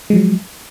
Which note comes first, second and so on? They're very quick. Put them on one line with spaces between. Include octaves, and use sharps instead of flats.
G#3 F3 F#3